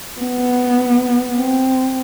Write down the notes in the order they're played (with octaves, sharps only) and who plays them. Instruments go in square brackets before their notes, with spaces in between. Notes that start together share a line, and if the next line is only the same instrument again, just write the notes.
[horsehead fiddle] B3
C4